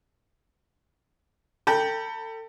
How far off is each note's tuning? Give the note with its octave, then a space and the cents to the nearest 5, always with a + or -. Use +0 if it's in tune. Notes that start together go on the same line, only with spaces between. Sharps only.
A4 +30 G5 +0 B5 -30